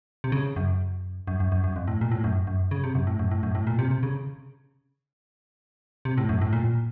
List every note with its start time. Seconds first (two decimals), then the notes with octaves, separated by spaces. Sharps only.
0.24 C3
0.32 C#3
0.56 F#2
1.27 F#2
1.40 F#2
1.52 F#2
1.64 F#2
1.76 F2
1.88 A2
2.01 A#2
2.11 A2
2.24 F#2
2.47 F#2
2.71 C#3
2.84 C3
2.95 F#2
3.07 A2
3.19 F#2
3.31 A2
3.43 F#2
3.55 A2
3.67 A#2
3.79 C3
3.91 C3
4.03 C#3
6.05 C3
6.18 A2
6.29 F#2
6.41 A2
6.53 A#2